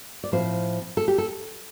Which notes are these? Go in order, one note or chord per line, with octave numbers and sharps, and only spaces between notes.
D5
A2 F3 C4 C5
A4
G4
A4